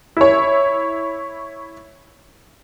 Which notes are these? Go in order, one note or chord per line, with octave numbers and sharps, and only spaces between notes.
E4 C#5